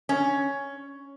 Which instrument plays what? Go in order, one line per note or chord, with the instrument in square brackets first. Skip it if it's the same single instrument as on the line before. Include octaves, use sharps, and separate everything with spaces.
[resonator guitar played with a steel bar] C#4